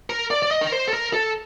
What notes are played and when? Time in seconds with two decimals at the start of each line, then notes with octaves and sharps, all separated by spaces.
0.10 A#4
0.31 D5
0.42 D5
0.51 D#5
0.61 A#4
0.72 C5
0.88 A4
0.93 A#4
1.13 A4